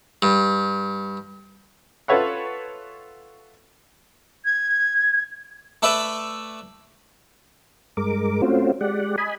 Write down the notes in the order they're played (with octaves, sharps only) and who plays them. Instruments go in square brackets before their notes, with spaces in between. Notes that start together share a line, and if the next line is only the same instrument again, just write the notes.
[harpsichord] G2
[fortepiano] F4 A4 B4 C#5 E5 F#5
[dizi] G#6
[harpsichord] A3 A4 B4 D5 E5
[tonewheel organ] G2 G#3 A#4 D6
A3 C4 C#4 F4 F#4 C5
G#3 G4 D5 F#5
D#5 G#5 B5